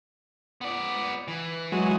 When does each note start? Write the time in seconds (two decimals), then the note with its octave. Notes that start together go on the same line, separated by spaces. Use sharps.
0.61 B3 D5
1.28 E3
1.72 F#3 G#3